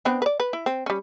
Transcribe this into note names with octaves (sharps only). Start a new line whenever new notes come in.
B3 C4 D4
B4 D5
B4
E4
C4
G3 C#4